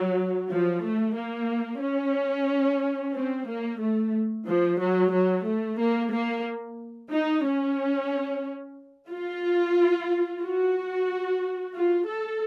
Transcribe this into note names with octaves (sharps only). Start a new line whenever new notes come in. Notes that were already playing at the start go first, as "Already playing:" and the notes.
Already playing: F#3
F3
A3
A#3
C#4
C4
A#3
A3
F3
F#3
F#3
A3
A#3
A#3
D#4
C#4
F4
F#4
F4
A4